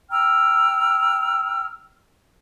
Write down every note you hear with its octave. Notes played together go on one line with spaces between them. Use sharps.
G5 A#5 E6 F6